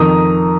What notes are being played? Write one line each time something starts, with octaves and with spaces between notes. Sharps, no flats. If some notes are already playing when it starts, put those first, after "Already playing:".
Already playing: F2 D#3 A#5 D#6